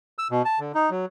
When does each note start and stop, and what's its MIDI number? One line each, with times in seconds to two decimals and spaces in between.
0.18 0.28 88
0.31 0.42 47
0.45 0.59 81
0.59 0.72 50
0.75 0.90 63
0.90 1.06 54